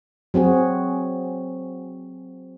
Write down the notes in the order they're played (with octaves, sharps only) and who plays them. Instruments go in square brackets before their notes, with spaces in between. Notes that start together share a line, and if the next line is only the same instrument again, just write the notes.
[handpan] F#3 C4 F#4 G#4